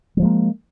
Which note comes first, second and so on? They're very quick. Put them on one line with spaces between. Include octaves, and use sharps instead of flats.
G3 F3 G#3 A#3